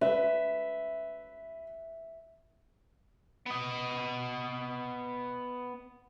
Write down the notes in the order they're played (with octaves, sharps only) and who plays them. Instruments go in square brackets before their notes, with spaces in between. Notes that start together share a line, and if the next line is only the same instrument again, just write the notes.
[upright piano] B4 [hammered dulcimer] E5
[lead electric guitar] B3 D#5